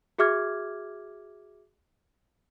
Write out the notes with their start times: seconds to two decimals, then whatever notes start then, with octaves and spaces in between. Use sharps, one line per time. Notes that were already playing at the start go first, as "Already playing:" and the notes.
0.18 F#4 G#4 E5 D6 F6 G#6